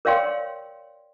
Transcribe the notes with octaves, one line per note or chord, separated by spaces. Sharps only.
A#4 C#5 D5 F5 G5 C6